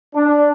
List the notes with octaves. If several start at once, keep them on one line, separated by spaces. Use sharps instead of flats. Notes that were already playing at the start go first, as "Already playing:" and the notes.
D4